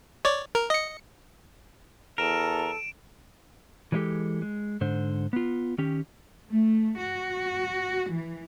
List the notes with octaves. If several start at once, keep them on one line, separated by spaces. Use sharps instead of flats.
C#5 D5
A#4
D#5 C#7
E2 A4 A#4 D7 E7
E3 F#3 G#3 D#4 G4 A4
G#3
G#2 D3 C5
B3 F4
D#3 C#4 G4
A3
F#4
E3